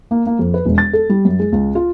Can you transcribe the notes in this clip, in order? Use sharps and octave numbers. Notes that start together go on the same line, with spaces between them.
A#3
A#3
F2
B4
E1
A6
A4
G3
F#2
G#3
C#2
F4